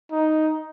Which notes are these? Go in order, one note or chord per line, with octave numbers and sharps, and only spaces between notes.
D#4